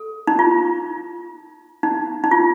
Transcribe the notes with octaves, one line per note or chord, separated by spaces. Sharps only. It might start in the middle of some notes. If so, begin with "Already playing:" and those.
Already playing: A4
D#4
F4
D#4
D#4
F4